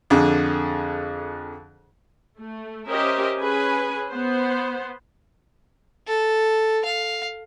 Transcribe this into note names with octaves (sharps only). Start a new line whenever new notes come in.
F2 D3 G#4
A3
C#4 G4 A#4 C5 D#5 E5
C#4 G#4 B4 G#5
B3 C5
A4
F5